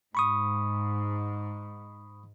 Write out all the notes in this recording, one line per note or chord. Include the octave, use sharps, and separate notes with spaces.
G#2 B5 C#6 D#6